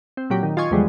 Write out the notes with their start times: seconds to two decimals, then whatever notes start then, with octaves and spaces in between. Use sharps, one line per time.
0.17 C4
0.30 A#2 F#3 G4
0.43 D#3
0.57 F4 D#5 G#5 C#6
0.71 E2 D3 F3 G3 G#3